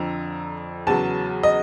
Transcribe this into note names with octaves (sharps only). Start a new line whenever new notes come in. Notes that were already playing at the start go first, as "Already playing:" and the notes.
Already playing: F2 D3 F3 A#5
E2 C#3 F#3 A5
D#5